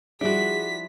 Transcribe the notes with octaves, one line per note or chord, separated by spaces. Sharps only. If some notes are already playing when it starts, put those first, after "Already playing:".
F3 G3 D4 E4 F#4 G#4 B6